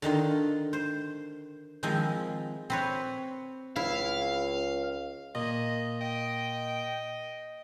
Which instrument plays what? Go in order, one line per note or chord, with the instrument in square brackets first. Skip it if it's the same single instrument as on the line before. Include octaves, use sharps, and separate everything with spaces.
[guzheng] D3 D#3 D#4 F4
C5
D#3 F3 G#3 C4 D#4 E4
C4 B4 C#5
[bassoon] C#2 [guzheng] E4 [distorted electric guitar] F5
[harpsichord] A#2 [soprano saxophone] D#5
[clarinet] D#5 [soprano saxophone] G5